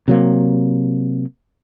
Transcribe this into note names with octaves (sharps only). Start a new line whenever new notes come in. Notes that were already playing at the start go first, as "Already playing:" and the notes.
C3 F#3 A#3